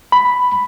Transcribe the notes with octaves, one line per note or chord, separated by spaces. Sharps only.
B5